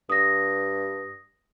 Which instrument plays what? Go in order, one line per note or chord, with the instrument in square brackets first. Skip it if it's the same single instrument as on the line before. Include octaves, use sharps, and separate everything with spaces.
[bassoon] G2 [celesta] D#6 A#6